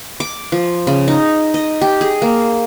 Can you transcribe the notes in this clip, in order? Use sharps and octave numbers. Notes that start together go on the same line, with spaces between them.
D6
F3
C#3
D#4
D#5
G4
G#4
A#3